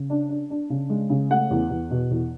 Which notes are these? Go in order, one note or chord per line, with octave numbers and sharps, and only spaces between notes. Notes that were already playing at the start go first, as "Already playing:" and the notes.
Already playing: C#3
D4
D4
D4
C#3
G#3
C#3
A3 F#5
E2
E2
B2
E2